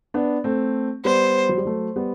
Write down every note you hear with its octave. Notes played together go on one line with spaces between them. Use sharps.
B3 D4
A3 C4
G3 B3 C5
F#3
G3
F#3 A3
G3 B3